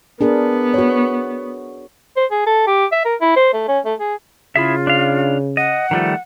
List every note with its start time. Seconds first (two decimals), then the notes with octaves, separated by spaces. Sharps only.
0.21 B3 D4 G#4 A#4
0.74 F#4 C#5
2.17 C5
2.31 G#4
2.46 A4
2.67 G4
2.92 E5
3.05 A#4
3.21 E4
3.37 C5
3.54 A3
3.68 C#4
3.85 A3
4.00 G#4
4.56 C#3 E4 F4 G#4 E5
4.87 D4 F5
5.57 D#5 F#5
5.91 D#3 F3 G3 A3